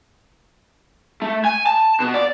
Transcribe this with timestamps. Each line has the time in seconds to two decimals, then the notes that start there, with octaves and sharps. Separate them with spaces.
1.22 A3
1.45 G#5
1.66 A5
2.00 B2
2.14 D5